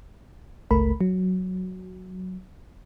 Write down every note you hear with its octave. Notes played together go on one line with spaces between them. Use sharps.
G1 C#2 A3 A#4 B5
F#3